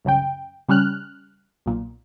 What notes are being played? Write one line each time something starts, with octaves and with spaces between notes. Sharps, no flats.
C2 F#2 C#3 G5
C#3 G3 C#4 F6 F#6
B1 A#2